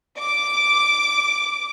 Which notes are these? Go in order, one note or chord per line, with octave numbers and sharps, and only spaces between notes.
D6